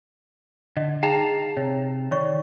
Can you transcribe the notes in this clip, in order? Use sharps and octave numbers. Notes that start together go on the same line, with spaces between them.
D3 D#5
D#4 G#4 F5 G5 A5 A#5
C3 C#5
D#3 C#5 D5 C#6